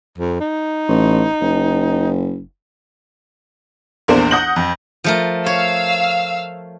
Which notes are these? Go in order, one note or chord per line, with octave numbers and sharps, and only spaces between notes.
F2
D#4
A1
F#1
A#1 E2 A#3 D4 C5
F#5 D#6 G6 A#6 F#7
F2
F3 A3 A#4
C#5 F5 E6